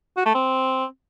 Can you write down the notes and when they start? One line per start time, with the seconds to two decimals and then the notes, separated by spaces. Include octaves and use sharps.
0.17 F#4
0.26 A3
0.34 C4